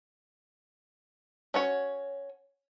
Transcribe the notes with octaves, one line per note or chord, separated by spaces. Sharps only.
C#4 F#4 C#5